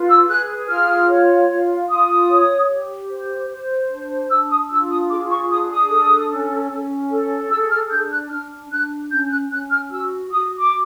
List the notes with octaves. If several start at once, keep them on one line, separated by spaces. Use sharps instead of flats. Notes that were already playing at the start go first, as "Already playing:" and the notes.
Already playing: F4 B4
E6
G#4 F#6
F4 F6
C#5
F4
F4 D#6
C#5
G4
C5
C5
D4
D4 E6
D#6
F4 E6
D#6
G#4 D6
C#6
D4 D#6
D#6
A4
C#4
C#4
A4
G#4 E6
F6
D4 G6
F#6
D4 F6
D4 F#6
C#4 G6
F#6
C#4 F#6
F6
F#4 E6
F#4 D#6
D6